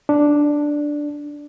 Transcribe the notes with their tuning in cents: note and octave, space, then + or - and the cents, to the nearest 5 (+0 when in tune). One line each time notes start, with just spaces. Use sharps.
D4 +0